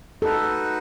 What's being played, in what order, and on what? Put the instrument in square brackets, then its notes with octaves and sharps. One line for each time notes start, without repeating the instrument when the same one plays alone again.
[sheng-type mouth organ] D#4 F#4 B4 [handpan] A4